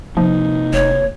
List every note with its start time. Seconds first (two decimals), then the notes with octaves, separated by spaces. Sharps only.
0.17 C3 F3 A#3 D#4
0.73 F1 C#5